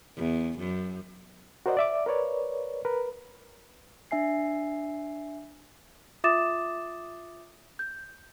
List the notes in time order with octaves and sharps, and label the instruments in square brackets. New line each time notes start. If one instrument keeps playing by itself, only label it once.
[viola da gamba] E2
F#2
[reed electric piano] F#4 A#4 C5 D5 D#5 F#5
D5 E5 D6
A#4 B4 C#5 D5
A#4 B4
[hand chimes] D4 E5 G#5 C7
[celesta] F4 E5 D6 D#6 A6 E7
G6